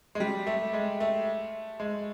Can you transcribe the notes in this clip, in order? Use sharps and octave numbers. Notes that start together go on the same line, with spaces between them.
G#3
G3
A3
G#3
A3
G#3